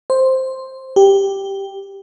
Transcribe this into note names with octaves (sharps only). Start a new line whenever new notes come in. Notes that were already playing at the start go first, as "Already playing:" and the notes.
C5
G4